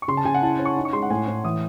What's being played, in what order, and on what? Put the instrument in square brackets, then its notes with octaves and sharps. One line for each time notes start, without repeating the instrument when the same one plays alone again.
[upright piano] C#6
[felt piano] C#3 [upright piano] C6
[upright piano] A5
[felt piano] C#3 [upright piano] G#5
[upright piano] F#5
[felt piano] E4 [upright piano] A5
[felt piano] C#4
[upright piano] C#6
[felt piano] D#4
[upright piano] C#6
[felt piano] G#3 [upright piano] C6
[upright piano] F#5
[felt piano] A2 [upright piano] G#5
[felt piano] A2
[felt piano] E3 [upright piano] D#6